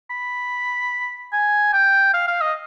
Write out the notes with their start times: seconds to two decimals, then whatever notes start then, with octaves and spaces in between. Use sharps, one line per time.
0.10 B5
1.33 G#5
1.73 G5
2.14 F5
2.27 F5
2.41 D#5